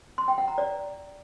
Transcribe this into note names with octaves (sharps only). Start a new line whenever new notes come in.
C6
G5
F#5
A#5
D5